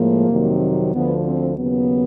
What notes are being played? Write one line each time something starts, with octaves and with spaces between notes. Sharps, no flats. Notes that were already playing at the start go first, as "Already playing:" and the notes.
Already playing: A2 F3 G#3 A#3
F2 C3 D#3 F#3
D2 D3 F3 B3
C4
D#2 C#3 F#3 B3